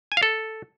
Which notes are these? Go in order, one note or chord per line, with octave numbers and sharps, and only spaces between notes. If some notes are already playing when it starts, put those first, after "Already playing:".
G#5
F5
A4